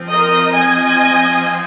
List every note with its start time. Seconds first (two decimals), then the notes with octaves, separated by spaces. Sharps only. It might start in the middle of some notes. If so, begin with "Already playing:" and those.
Already playing: F3 C4
0.11 A#4 D#5
0.55 D#5 G#5